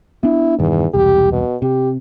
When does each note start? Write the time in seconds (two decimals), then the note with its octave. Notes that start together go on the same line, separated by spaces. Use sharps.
0.23 B3 D4 E4
0.59 E1 E2 G2 D#3
0.94 E1 C2 G4
1.32 B2
1.62 C3 G4